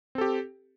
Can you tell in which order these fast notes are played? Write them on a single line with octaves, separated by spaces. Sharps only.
C4 A4 G4